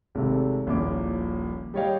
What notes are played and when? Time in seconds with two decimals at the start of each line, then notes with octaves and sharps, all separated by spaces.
0.15 G#1 C3 A3
0.66 D#1 A#1 A#3 C#4 E4 D6
1.74 G3 G4 C#5 D#5 F5 G5